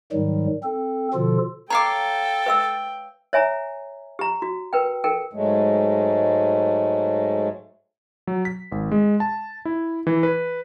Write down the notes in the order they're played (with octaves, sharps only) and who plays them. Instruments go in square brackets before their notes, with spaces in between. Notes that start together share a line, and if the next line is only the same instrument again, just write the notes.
[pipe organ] G#2 D#3 F#3 G3
C4 A4
B2 D3 F3 F4 A4
[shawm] A4 [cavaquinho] C#5 F5 D6 [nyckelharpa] G5 [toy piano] A#5
[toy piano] B4 E5 E6
C#5 E5 G#5 A#5
G4 A#5
F#4
A#4 B4 G5
A4 A#4 G5
[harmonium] G#2 F#3 G#3 A3
[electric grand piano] F#3
B6
G#1
G#3
A5
E4
E3
B4